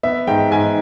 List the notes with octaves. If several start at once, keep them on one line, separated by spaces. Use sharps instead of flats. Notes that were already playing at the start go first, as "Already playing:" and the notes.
B3 E5
G#2 G5
G#2 G#5